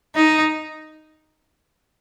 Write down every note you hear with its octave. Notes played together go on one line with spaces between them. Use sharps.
D#4